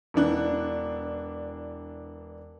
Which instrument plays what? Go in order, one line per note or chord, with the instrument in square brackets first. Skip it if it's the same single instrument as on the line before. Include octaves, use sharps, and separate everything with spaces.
[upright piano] E1 E3 D4 F#6